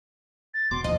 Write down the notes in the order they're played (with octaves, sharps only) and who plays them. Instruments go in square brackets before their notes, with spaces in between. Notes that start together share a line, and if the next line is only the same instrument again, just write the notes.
[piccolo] A6
[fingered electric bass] E1 B2 [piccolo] C6 [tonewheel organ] D6
[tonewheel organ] D#2 F3 [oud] D#5